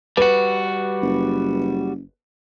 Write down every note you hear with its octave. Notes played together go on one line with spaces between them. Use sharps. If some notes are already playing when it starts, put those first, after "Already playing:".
G3 F#4 B4
F#1